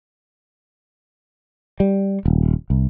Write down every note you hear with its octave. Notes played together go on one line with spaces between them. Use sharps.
G3
D#1
C2